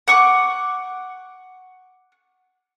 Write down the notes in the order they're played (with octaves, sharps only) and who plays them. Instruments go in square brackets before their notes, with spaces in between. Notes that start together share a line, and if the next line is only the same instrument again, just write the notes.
[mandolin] F#5 C#6 D6